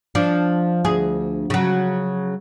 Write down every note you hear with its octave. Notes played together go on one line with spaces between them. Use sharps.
F3 D4
D2 G#4
C#3 F#3